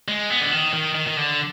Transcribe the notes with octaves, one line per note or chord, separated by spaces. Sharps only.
G#3
B3
D3
D#3
D#3
D#3
D#3
D3